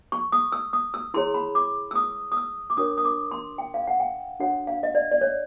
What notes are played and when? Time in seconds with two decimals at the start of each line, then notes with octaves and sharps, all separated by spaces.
0.12 C#6
0.32 D#6
0.52 E6
0.73 D#6
0.94 E6
1.14 E4 G#4 C#5 C6
1.34 B5
1.55 D6
1.91 E6
1.96 D#6
2.32 D#6
2.37 E6
2.70 D6
2.77 D4 F#4 A#4 C#5 D#6
2.98 D#6
3.05 D6
3.31 C6
3.58 G5
3.74 F5
3.87 F#5
4.00 G5
4.40 D4 F#4 A4 C#5 F#5
4.67 F5
4.83 D#5
4.95 D5
5.12 D5
5.21 C#5